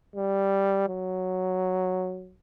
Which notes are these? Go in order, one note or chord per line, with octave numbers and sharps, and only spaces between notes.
G3
F#3